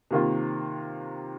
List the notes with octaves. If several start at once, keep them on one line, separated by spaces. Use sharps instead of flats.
C3 D#3 A#3 F4